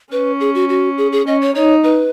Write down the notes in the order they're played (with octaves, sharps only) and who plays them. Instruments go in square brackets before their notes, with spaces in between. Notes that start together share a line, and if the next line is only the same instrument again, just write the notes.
[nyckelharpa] C#4 [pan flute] B4
[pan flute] G#4
F#4
F#4
G#4
G#4
[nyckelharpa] C#4 [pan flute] D#5
[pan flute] C#5
[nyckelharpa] D#4 [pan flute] C#5
[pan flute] B4